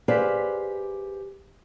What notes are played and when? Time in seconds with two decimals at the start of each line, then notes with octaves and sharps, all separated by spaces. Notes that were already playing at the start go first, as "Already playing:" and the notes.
0.08 G4 G#4 B4 C5 D5 F5